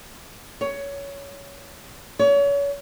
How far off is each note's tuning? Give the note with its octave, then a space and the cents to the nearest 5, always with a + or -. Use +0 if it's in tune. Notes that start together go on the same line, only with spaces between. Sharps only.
C#5 +15
C#5 +35